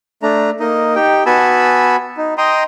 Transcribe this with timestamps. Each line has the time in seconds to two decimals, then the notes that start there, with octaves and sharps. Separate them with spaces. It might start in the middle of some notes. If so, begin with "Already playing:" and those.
0.23 A3 D4 A#5
0.60 A#3 D#4 D#5
0.95 D#4 G4 G5
1.26 B3 F#4 G#5 A5 B5 E6
2.17 D#4
2.38 D#5 G5 A#5 C6 D#6